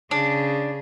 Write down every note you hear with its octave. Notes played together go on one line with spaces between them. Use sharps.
C#3 D4 G#4